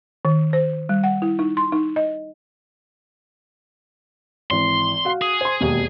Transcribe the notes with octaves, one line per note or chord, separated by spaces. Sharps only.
D#3
C5
G3
F#5
E4
D#4
C6
D#4
D#5
G#1 E3 C6
F#4 F5
G#4
C5 C6
E1 D#2 B2